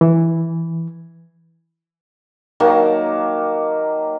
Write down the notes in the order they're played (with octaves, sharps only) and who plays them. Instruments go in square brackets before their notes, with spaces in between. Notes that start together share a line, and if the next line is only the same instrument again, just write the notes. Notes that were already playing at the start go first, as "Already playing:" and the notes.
[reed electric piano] E3
[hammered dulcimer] D#3 F#3 A#3 A5